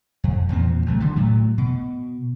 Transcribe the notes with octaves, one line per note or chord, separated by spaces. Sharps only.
F2
E2 A#2 F3 C4
C2 F#3 A3
D3 E3 G3
A2 F#3 A3
B2